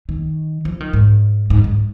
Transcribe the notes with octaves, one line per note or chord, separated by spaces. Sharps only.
D#3
F3
D#3
G#2
G#2
G#2